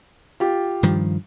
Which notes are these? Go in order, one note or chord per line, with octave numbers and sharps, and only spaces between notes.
F4 G4
G2 D#3 F3